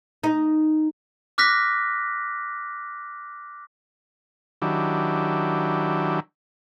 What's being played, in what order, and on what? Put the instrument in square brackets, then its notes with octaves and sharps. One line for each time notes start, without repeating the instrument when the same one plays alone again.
[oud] D#4
[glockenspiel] D6 F6 F#6 A#6 B6
[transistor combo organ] D#3 F#3 D4 E4 G4